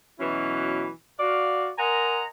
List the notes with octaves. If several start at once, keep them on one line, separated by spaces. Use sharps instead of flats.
B2 E3 F#3 C#4 E4
F#4 D5 F5
A#4 D#5 F#5 G#5 A#5 C6